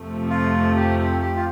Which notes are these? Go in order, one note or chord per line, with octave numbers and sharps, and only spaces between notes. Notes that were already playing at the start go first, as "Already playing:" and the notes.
Already playing: F2 C3 F3 A3
F4
G4
G4
G4
F4